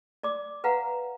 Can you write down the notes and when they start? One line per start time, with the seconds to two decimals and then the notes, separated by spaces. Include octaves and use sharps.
0.23 D5 D6
0.64 B4 F5 F#5 A#5